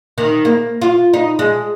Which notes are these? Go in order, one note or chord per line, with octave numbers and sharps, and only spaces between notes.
D#3
A#3
F4
D#4
G#3